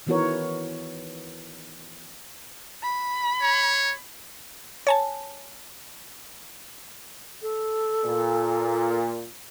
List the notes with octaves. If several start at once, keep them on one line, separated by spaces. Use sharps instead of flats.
D#3 E3 B3 F#4 A#4 C#5
B5
C#5
C#5 G#5 A5
A4
A#2